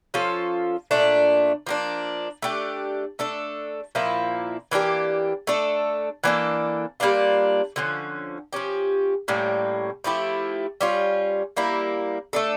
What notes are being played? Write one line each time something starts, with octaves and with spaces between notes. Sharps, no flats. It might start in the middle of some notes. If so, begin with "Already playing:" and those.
F3 C#4 F4 A4
A#2 A3 D4
F3 A#3 D4
A3 D4 G4
A3 D4 A4
A#2 F3 A#3 E4
E3 A#3 D4 G4
A3 D4 A4
E3 A#3 D4 A4
G3 A#3 D4 F4
D3 F3 C#4
F3 C#4 G4
A2 G3 A#3 C#4
F3 A3 E4 G4
G3 C#4 F4
G3 A#3 E4
A3 D4 A4